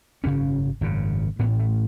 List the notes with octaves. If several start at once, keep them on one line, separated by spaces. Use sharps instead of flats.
G#1 F#2 C#3 C#4
G#1 F#2 C#3
A1 A2 B3
A3